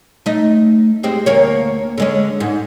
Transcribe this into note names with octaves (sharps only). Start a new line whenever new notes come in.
A3 D#4
G3 G#3 C4
D2 A#3 C#5
D3 G#3 C#4
G#2